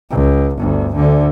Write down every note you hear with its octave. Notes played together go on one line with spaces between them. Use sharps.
C#2
G1 D2
D2 D3